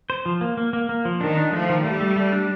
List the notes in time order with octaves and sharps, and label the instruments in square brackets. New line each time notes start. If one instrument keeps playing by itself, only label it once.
[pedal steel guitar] C5
F3
A#3
A#3
A#3
A#3
F3
[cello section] D#3 [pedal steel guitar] D4
[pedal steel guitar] D4
[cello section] F3 [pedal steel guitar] A3
[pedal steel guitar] D#3
[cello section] G3 [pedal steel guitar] A3
[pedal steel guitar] A3
A3
D4